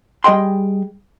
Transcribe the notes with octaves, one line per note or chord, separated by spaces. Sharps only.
G3 G#4 D#5 G5 C6